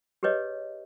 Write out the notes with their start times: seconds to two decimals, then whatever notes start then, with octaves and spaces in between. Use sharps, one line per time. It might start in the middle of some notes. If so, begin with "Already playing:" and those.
0.23 G4 G#4 B4 C#5 D#5